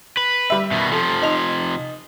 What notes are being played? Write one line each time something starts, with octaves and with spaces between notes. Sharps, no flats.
B4
G3 E5
B2 D#3
C3 F3 A4
D#4 F7